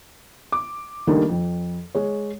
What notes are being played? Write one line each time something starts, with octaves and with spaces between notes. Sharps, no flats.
D6
D#3 G3 A3 A#3 D4 D#4
F2
G#3 C#5